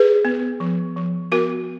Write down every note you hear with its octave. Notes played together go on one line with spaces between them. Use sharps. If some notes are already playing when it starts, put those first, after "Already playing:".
Already playing: G#4 B4
B3
F3
F3
B3 F#4 A#4